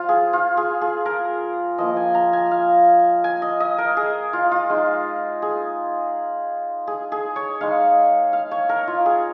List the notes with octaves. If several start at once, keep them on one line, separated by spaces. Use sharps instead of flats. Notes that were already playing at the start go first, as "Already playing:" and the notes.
Already playing: F3 F4 F5
G#4
F4
G#4
G#4
A#4
F3 A#3 F4 D#5
G#5
A#5
G#5
F5
G#5
D#5
D#5
A#4
G#4
F4
F4
G#3 D#4
G#4
G#4
G#4
C#5
G#3 D#4 F5
F5
C#5
A#4
F4
G#4